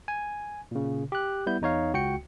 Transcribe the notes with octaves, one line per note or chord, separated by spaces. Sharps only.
G#5
A#2 C#3
G4 F#6
G3 B3 E4 G6
E2 D#4 C#5 F5
C#2 F#4 G5 C#7